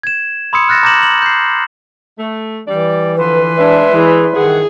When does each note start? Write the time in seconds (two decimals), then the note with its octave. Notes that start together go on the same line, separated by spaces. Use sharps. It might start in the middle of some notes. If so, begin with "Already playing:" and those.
0.03 G#6 E7
0.53 B5 C6 D#6 E6 G#6 C#7
0.69 F6 F#6 A6 A#6 C#7 E7
0.83 A#5 D6 G6 A#6 E7 F#7
1.03 F#7
1.22 G6 C7
2.19 A3
2.68 E3 G3 D5
3.18 D3 F3 B4 C6
3.58 G#3 D4 E5
3.92 E3 G#4
4.36 G2 D#3 E3 G#4 F#5